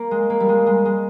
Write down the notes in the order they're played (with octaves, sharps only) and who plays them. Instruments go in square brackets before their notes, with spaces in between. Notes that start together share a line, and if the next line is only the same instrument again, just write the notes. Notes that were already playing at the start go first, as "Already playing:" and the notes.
Already playing: [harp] A#3
G#3
A#3
G3
G#3
G#3
G#3